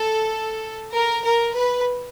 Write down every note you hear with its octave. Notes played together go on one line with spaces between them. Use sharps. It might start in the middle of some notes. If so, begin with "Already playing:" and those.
Already playing: A4
A#4
A#4
B4